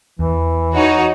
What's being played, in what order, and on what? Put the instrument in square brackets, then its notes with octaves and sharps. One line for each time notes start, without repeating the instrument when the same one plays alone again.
[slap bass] E2 [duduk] E3
[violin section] D#4 F#4 C#5